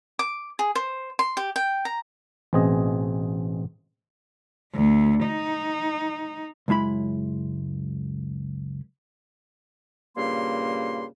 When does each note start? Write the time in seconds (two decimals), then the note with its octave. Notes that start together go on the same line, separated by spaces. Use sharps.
0.19 D6
0.59 G#4
0.75 C5
1.19 C6
1.37 G4
1.56 G5
1.85 A#5
2.53 A1 B2 C4 G#4 D#5
4.74 D2
5.25 D#4
6.68 C#2 F#2 G#3 E4 B5
10.16 G2 A#2 C#3 A#3 C6